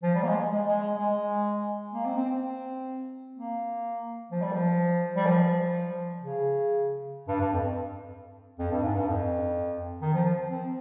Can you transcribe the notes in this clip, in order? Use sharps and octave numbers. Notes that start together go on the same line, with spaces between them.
F3
G3
A#3
G#3
G#3
G#3
G#3
G#3
A#3
C4
C4
C4
A#3
F3
G3
F3
G3
F3
C#3
G2
G2
F2
F2
G2
G#2
G2
F2
D#3
F3
F3
C4